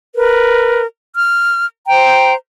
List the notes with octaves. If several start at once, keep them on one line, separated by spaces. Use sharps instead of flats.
A#4 B4
F6
C5 G5 A#5